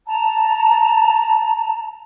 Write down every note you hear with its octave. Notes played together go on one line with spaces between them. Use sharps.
A5 A#5